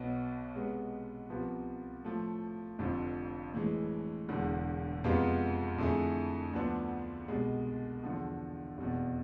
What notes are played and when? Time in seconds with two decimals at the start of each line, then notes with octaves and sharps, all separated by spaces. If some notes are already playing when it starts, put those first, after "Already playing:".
Already playing: B1 B2 B3
0.55 C3 G#3 B3
1.30 C2 C3 F3 B3
2.05 A2 F3 A3
2.79 F1 F2 D3 F3
3.54 A2 E3 G#3
4.28 E1 E2 D3
5.04 F2 C3 G#3 B3 F4
5.78 F2 D3 A3 E4 G#4
6.53 D2 D3 F3 B3 D4
7.28 C2 B2 G#3
8.04 E2 D3 F3
8.78 F1 E2 B2